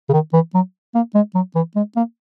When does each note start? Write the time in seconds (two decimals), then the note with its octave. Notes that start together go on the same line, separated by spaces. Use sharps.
0.09 C#3
0.13 D#3
0.33 E3
0.54 F#3
0.95 A#3
1.15 G#3
1.35 F#3
1.55 E3
1.76 G#3
1.96 A#3